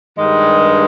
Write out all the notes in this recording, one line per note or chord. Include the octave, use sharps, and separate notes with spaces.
G2 D#3 G#3